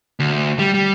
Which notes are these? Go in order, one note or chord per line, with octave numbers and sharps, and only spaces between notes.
D2
G3
G3